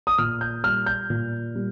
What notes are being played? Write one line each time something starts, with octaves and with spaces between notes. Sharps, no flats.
D#6
A#2 F6
G6
G3 F6
G6
A#2
G3